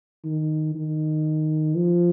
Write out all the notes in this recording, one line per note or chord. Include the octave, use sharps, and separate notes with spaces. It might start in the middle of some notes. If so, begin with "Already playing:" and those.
D#3
D#3
F3